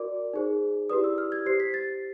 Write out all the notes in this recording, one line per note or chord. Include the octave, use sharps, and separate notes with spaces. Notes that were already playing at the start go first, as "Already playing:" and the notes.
Already playing: F#4 A#4 D5 D6
D#4 G#4 C5
E4 G4 B4 D5 D#6
E6
F6
G#6
G4 C5 C7
B6
A6